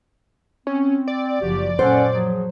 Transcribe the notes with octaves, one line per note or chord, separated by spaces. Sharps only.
C4 C#4
D5
F#1 F3 F#4 G4
F#2 A#2 C#4 A4 C5 F#5
F3 F#3 G#4